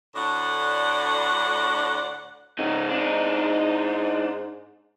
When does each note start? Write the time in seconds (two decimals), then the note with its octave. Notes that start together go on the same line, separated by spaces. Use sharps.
0.16 D2 A2 D4 D5 F#5
2.59 G#2 C#3 D#4
2.90 D4 D#4